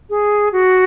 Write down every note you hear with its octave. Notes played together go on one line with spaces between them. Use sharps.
G#4
F#4